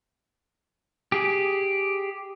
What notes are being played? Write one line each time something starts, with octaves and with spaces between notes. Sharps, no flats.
G4 G#4